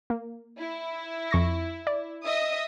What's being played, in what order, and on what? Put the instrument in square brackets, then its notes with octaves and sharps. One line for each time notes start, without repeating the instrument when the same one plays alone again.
[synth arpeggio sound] A#3
[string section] E4
[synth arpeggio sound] F2 C#6 A#6
D5
[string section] D#5 E5 D#6